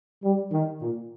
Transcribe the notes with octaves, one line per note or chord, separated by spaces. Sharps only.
G3
D#3
A#2